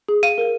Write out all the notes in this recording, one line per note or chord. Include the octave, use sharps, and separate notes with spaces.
G#4
F5 D#7
A#4